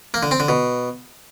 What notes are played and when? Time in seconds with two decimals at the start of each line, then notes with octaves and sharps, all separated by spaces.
0.14 A#3
0.23 D3
0.31 C4
0.40 D3
0.48 B2